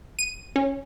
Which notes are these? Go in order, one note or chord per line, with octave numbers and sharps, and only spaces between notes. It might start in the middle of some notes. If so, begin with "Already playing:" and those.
D#7
C#4